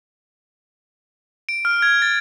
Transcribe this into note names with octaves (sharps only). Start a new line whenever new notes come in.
D7
F6
G#6
A6